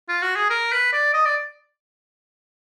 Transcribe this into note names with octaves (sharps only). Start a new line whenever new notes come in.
F4
F#4
G#4
A#4
B4
D5
D#5
D5